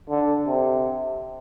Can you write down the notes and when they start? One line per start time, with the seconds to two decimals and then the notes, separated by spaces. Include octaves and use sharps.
0.10 D3
0.47 C3